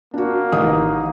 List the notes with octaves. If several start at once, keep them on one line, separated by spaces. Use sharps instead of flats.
A#3 D4 F#4
A1 D#3 D#6